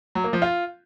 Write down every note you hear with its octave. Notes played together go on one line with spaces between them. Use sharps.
F#3
A#3
F3
F4